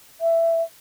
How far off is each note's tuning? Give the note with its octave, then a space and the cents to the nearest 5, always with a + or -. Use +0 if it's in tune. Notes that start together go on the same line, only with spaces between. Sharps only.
E5 +10